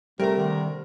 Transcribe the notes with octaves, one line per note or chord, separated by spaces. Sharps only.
C3 G3 A3 A#4 A#5
D3 D#3